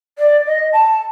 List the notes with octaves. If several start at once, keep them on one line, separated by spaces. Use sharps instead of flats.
D5
D#5
A5